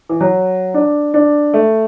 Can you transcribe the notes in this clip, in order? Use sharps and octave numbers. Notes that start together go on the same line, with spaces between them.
E3
F#3
D4
D4
A3